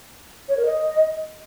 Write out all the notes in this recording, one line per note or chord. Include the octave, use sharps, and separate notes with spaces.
C#5
A#4
D#5